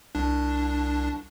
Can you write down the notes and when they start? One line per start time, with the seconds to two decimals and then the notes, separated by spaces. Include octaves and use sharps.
0.15 C2 D4